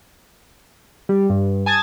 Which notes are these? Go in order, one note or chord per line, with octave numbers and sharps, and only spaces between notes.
G3
G2
G#5 A5 D#6 G#6 A6